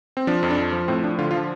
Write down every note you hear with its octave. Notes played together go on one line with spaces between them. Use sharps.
C4
F3 D4
F2
D4
F3
F3
A2 C4
F3 D4
D3 F4
F4
F3